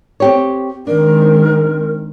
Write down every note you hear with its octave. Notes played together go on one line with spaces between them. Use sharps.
C4 G4 C#5
D#3 G#3 C4 D4 A#4